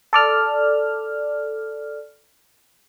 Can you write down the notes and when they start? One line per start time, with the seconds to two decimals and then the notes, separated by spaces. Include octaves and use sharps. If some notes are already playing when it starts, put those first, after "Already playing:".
0.13 A4 D5 F6